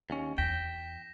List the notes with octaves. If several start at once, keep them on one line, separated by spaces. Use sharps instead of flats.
D#2 C#4
E2 G5 A#6 B6 E7